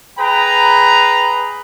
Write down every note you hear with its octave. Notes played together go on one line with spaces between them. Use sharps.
G#4 B4 G5 A#5